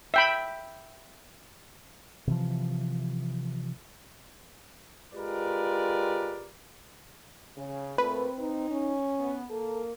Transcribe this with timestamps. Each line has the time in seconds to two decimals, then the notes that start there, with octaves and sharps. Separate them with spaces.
0.14 E5 G5 B5
2.27 C3 E3 F3
5.14 G#3 F4 G4 A#4 B4 D5
7.57 C#3
7.98 A#2 A3 C4 B4
8.39 D#4
8.71 C#4
9.20 B3
9.50 A#3 A4 A#4